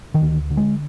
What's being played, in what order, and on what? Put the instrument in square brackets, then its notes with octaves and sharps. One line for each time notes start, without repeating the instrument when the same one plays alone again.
[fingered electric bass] D#3
D2
D3
G#3